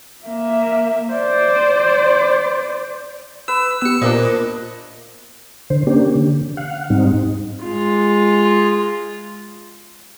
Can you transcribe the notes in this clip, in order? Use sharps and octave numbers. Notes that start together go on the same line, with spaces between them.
A#3 E5
C5 D5
B4 E6
B3 G4 E6 C#7
A#2 D4 F4 A#4 C5 D#5
D3 C5
A#3 C#4 D4 G4
D3
F5 F#5
G#2 G3 C4 D#4
G#3 F4